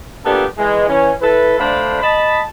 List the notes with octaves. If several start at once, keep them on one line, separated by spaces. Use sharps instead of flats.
F3 A#3 B3 D4 G4 A4
E3 G#3
E3 C#4
E4 A4 B4
D3 A3 D4 C5 F5 B5
D#5 A5 B5